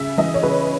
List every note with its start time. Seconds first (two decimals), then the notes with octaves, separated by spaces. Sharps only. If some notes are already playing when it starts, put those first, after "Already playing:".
Already playing: C#3 E5
0.18 E3 D#5
0.34 C#5
0.43 C#3 B4